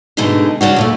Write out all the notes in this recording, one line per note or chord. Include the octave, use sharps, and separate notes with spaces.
G#2 B2 D3 A3 D#4 G#4
C#3 C#4 D4 F#4
D2 A#2 A3